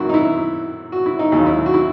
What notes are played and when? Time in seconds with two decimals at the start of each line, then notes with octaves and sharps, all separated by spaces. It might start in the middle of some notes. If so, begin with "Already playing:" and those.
Already playing: G#1 F#2 D#3 F#3 E4 F#4
0.09 D#4
0.14 E4
0.92 F#4
1.06 E4
1.19 D#4
1.32 D#2 C#3 F#3 D#4
1.46 E4
1.66 F#4
1.74 E4